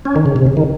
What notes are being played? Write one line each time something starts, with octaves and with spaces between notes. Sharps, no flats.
C#4
D#3
C#3
C3
C#3
D#3